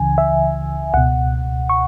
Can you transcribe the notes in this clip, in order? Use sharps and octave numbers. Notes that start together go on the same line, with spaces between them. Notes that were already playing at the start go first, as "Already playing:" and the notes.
Already playing: C#2 C#3 E3 G#5
E5
C#2 B2 F#5
C#6